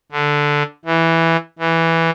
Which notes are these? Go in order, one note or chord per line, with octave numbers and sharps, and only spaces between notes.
D3
E3
E3